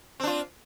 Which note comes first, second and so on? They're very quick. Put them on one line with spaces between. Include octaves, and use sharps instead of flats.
C4 D4 F4